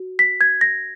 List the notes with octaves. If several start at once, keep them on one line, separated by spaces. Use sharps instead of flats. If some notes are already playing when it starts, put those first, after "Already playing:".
Already playing: F#4
B6
G#6
A#6